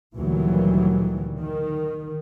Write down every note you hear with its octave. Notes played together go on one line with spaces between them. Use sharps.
D2 A#2 D#3 E3 F#3 G3
D#3